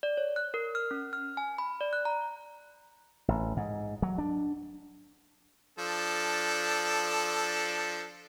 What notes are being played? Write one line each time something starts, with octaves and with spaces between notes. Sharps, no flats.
D5
C#5
F#6
A#4
F6
C#4
F6
G#5
B5
D5
F#6
A#5
A1
G#2
F#3
D4
F3 D4 A4